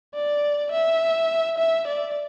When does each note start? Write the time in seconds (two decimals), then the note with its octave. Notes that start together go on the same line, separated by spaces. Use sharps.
0.14 D5
0.72 E5
1.58 E5
1.88 D5